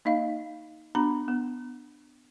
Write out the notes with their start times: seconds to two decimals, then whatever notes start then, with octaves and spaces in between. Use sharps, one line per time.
0.05 A#3 D#4 D#5 F5
0.95 B3 D4 F#4 A#5 B5
1.28 B3